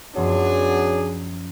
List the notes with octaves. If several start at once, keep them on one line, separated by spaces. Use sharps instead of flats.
F#2 F3 F#3 B3 D4 G#4 C6